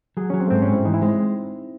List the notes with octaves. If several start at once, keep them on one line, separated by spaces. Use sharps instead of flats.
F#3 G#4
F#3 C#4
C4
A3
G#2 C4
C#4
G#2
E4
E3 D#4
E4
G#3 C4